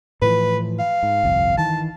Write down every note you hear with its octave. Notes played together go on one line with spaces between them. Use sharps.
A2 E3 F3 B4
F5
G#2
G1 C2 F2
D#3 E3 A5